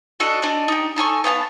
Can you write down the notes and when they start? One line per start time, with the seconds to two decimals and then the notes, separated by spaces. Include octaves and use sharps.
0.20 D4 F#4 A4 D#5
0.42 D4 D5 D#5
0.68 D#4 G4
0.96 D#4 A4 G#5 C#6
1.24 B3 F5 G5 A5